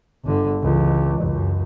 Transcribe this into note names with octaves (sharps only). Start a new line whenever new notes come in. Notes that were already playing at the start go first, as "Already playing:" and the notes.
G1 D3
C#2 E3
C#2 F#2